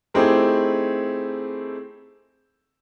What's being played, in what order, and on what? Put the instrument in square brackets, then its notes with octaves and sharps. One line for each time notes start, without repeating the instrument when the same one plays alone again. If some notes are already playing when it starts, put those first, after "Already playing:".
[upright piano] A3 C4 D#4 E4 G4 G#4